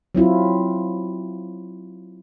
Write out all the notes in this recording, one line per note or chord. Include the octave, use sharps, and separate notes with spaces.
F#3 C4 E4 F4